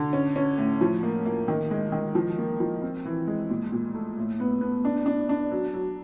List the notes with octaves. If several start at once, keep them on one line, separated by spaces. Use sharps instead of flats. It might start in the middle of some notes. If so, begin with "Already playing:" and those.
Already playing: D3
C#4
C#4
A2
F3
A#3
A#3
D#3
G#3
D#3
F3
A#3
F3
C4
E3
G#3
A#2
A#2
A3
A2
B3
B3
D4
D4
D4
F#3
F#3